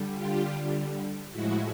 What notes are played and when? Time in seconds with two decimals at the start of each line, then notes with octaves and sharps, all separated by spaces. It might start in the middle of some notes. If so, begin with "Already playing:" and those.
Already playing: D3 G3
0.14 F4 G4
1.31 A2 F3 G#3 E4 F#4